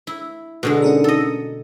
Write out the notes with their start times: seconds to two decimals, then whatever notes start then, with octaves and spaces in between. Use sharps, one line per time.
0.07 E4
0.63 B2 D3 G#3
0.82 C#4 D#4 A#4
1.04 A4 D#5